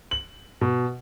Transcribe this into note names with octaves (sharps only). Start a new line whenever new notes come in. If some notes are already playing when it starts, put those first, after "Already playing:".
F#7
B2